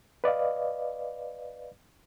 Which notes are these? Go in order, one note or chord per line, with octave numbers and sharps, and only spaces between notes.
B4 D5 D#5 F5